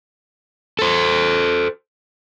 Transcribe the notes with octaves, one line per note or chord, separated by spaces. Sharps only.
A4 C5